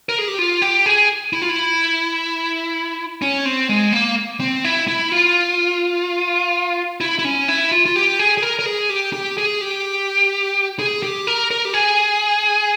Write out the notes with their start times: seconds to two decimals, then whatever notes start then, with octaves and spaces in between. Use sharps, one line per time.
0.09 A#4
0.19 G#4
0.28 G4
0.39 F4
0.62 G4
0.86 G#4
1.33 E4
1.42 F4
1.49 E4
3.22 C#4
3.45 C4
3.69 G#3
3.93 A#3
4.40 C4
4.65 E4
4.88 E4
5.12 F4
7.01 E4
7.19 E4
7.25 C#4
7.48 E4
7.71 F4
7.86 F4
7.96 G4
8.19 G#4
8.38 G#4
8.42 A#4
8.59 A#4
8.66 G#4
8.90 G4
9.13 G4
9.38 G#4
9.61 G4
10.79 G#4
11.03 G4
11.27 A#4
11.51 A#4
11.65 G4
11.74 G#4